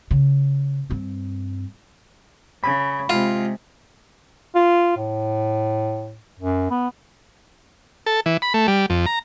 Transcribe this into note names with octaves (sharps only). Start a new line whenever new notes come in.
C#3
G2 C4
C#3 B5
C3 G#3 F4
F4
A2
F#2
B3
A4
E3
B5
A3
G3
F2
A#5